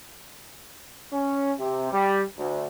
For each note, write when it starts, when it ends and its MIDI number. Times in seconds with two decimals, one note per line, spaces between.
1.13 1.53 61
1.59 1.88 48
1.93 2.22 55
2.38 2.67 38